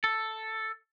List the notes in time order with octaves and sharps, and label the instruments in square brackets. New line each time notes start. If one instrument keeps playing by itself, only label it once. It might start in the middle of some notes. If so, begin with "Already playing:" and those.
[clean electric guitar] A4